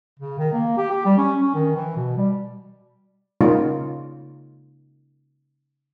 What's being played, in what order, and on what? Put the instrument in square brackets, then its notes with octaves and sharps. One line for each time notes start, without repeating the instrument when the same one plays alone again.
[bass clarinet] C#3
D#3
A#3
G4
G4
G3
C#4
C#4
D#3
E3
B2
G3
[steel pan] C#3 G#3 A#3 D#4 F4 C#5